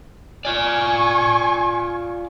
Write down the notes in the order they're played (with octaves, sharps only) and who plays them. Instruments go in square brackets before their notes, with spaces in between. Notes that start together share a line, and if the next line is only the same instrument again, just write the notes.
[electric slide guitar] F4 D5 [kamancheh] G#5 C#6